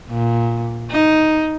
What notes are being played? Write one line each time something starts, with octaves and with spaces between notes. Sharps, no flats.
A#2
D#4